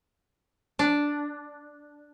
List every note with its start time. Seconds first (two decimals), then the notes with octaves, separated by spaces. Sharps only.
0.79 D4